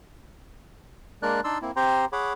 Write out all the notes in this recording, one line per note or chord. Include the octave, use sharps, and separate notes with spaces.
G#3 A#3 D4 A#4 D5 F#6
D4 D#4 D5 C6 E6
A#3 C4 E4
C4 G4 C5 G5 A#5 C6
G#4 C#5 F#5 B5 D6